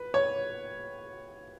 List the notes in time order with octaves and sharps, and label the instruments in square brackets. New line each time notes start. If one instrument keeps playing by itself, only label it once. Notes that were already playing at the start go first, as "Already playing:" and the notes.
Already playing: [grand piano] B4
C#5